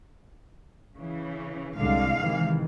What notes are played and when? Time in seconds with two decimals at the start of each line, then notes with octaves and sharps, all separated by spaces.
0.96 C#3 E3
1.77 C2 D3 G#3 F5
2.20 C3 D#3 E3